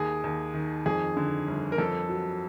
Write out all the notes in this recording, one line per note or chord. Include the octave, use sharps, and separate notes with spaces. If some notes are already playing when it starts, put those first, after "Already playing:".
Already playing: D#2 G#4
D#2
D#3
F2 G#4
D3
G1
A#4
F2 A4
F#3